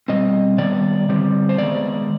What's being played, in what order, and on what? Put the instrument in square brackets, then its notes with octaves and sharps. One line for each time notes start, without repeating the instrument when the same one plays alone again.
[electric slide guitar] B2 G3 C4 D#5
D#3 G3 B3 D5
D3 G3 C4
C5
D#3 G#3 B3 D5